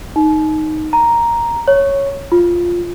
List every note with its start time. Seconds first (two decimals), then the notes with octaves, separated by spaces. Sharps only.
0.16 D#4
0.93 A#5
1.68 C#5
2.32 F4